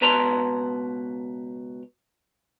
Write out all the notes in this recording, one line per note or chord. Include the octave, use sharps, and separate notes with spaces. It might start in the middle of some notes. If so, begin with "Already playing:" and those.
C#2 B2 B4 A5 A#5 C6